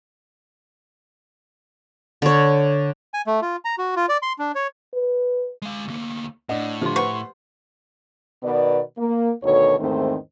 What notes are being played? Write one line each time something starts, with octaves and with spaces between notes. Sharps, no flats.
D3 C#5
G#5
A3
F4
A#5
F#4
F4
D5
C6
D4
C#5
B4
G#3 F5
D2 A#3
A2 D4 D#5 F#5
D3 F3 G4 C6
B4 C5 F#5 C#6
B2 D#3 B3 D5
A#3
D2 B2 D#3 A4 C#5
E2 G#2 D#3 A3 C4 C5